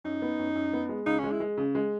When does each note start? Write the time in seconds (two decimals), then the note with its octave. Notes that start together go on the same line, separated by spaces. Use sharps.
0.04 F#2 D#4
0.22 B3
0.39 F#2
0.55 F#2
0.73 B3
0.89 G#3
1.06 C#2 D#4
1.19 G#3 C#4
1.32 E4
1.40 G#3
1.57 C#3
1.75 G#3